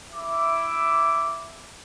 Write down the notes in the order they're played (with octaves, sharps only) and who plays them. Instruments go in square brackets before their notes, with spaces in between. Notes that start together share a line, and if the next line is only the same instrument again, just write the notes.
[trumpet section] E4 E5 D6